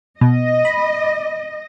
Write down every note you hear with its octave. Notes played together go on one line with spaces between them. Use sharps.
B2 D#5
B5